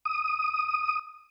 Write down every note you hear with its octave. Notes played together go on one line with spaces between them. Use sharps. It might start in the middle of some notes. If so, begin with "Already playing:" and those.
D#6